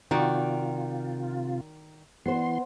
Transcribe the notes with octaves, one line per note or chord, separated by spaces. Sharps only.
C3 D#3 F4 F#4 D5 G5
E3 B3 C5 C6